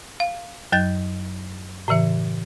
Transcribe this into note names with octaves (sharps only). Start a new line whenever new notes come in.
F5
F#2 F#3 G6 A6
A2 C#3 E3 E5